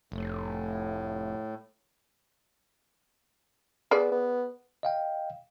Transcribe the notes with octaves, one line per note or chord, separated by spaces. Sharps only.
F1 A2
B3 G#4 B4 D5
B3
D#5 F5 G5